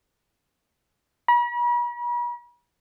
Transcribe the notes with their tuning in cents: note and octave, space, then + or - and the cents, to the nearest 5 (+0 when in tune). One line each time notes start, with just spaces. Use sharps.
B5 -45